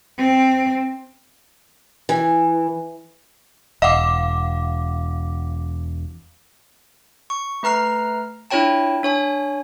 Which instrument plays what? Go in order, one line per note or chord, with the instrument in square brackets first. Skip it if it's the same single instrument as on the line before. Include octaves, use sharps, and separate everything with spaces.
[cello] C4
[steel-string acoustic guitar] E3
[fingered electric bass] E1 [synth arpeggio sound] D#5 [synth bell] F5 F#5 D6
[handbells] C#6
A3 B4 A#5 F6 C7
D4 E4 F4 C#5 G5 A5
D4 C#5 G#5